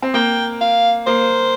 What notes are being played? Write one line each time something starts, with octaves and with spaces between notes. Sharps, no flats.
C4
A#3 G5
F5
A#3 C5